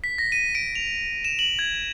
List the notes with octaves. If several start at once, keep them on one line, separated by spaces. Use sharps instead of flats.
B6
A#6
D#7
D7
F7
E7
F#7
G#6